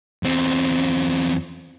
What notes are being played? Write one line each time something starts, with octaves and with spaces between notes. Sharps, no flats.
E2 C4